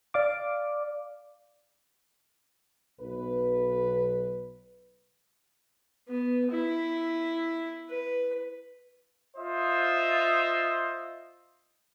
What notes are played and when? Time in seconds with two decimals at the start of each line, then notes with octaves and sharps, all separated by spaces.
0.14 D5 F5 D6
3.01 B1 B4
6.09 B3
6.52 E4
7.90 B4
9.37 F4 C5 D#5 E5